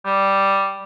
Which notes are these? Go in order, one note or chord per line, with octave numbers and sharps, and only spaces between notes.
G3